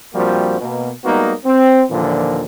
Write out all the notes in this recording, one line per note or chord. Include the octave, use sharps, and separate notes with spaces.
A#1 F3 G3 A#3 C4 F#4
B2 A#3
G3 G#3 A#3 B3 D#4 F#4
C4
D#2 A#2 D3 E3 F3